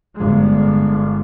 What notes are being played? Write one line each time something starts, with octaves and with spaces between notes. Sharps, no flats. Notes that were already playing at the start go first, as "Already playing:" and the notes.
G1 G#3